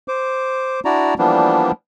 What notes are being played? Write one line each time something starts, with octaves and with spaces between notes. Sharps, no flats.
C5 D6
D4 E4 F#4 D5 A#5
E3 F3 G3 A#3 B3 D4